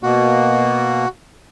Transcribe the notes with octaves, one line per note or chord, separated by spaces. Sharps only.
B2 A#3 F#4